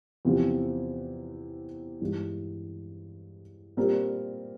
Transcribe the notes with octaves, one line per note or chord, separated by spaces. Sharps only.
E2 C3 F3 C4 F4
G2 E3 G#3
A#2 G3 C4 F4 A#4